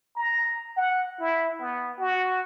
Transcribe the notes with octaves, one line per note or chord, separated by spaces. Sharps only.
A#5
F#5
E4
B3
F#4